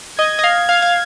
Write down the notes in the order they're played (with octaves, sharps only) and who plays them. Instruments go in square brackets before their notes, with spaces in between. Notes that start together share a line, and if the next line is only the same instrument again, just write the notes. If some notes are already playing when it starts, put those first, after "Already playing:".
[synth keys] D#5 [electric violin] G#6
[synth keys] D#5
F5
F5
F5